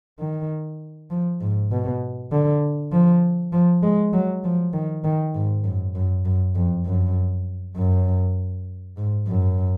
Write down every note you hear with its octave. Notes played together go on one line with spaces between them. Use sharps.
D#3
F3
G#2
B2
D3
F3
F3
G#3
F#3
F3
D#3
D#3
G#2
F#2
F#2
F#2
F2
F#2
F#2
G#2
F#2